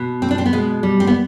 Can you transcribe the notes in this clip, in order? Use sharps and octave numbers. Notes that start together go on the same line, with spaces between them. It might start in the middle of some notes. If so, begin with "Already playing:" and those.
Already playing: B2
C4
D4
C4
B3
B2 G#3
G3
C4
B3